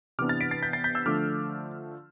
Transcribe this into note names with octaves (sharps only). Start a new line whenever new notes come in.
C3 E3 B3 D4 D6 F6
F6 A6
B6 D7
A6 C7
G6 B6
A6 C7
G6 B6
E6 G6
D3 F3 A3 D4 D6 F6